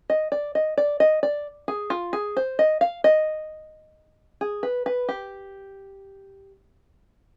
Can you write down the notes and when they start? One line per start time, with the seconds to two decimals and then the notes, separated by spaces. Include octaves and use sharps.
0.10 D#5
0.32 D5
0.55 D#5
0.78 D5
1.00 D#5
1.23 D5
1.68 G#4
1.90 F4
2.13 G#4
2.37 C5
2.59 D#5
2.81 F5
3.04 D#5
4.41 G#4
4.63 B4
4.86 B4
5.09 G4